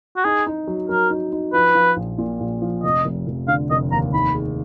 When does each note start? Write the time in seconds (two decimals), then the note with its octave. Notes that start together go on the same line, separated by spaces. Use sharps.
0.17 F#4
0.25 D#4 G#4
0.47 D#4
0.67 F#3
0.89 F#3 A#4
1.10 D#4
1.33 D#4
1.53 F3 B4
1.75 F3
1.97 A#1
2.18 A#2
2.40 A#1
2.62 F3
2.84 F1 D#5
3.05 F1
3.27 F1
3.48 D3 F5
3.71 F1 D#5
3.92 D#2 A#5
4.14 D#3 B5
4.34 G#4